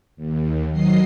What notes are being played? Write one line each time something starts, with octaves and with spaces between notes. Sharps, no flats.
D#2
D#3 F#3 D#5 C7